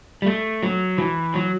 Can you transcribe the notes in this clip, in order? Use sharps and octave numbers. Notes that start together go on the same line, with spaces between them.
G3
A3
F#3
E3
F#3